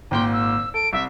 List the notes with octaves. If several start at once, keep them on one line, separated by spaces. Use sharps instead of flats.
G#1 A#2 G5 C6
E6
A4 D7
C2 E5